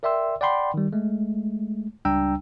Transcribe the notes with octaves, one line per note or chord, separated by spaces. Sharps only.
A#4 D5 E5 G5 C6 E6
D5 F#5 G5 B5 C6
D#3 G3
G#3 A3
C#2 G3 D4 G5 A#5 E6